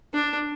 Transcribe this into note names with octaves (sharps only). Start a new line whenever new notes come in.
D4